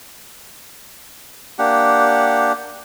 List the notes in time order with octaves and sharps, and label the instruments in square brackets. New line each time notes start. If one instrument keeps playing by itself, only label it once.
[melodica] A#3 D4 G4 F#5